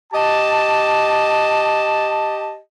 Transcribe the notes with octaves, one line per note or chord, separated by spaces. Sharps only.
G4 D#5 A5